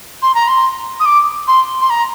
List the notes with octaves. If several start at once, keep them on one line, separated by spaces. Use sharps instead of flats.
C6
A#5
C6
D#6
D6
C6
C6
A#5